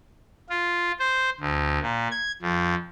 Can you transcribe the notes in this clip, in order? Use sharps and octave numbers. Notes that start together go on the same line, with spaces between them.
F4
C5
D2
A#2
G#6
F2